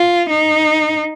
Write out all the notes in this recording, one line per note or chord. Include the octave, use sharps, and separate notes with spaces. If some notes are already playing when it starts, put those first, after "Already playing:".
Already playing: F4
D#4